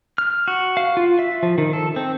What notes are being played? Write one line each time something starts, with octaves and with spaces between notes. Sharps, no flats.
F6
F#4
F5
F4
E5
F3
D#3
A4
C4